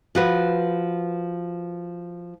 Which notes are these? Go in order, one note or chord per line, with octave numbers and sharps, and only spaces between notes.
F3 F#4 B4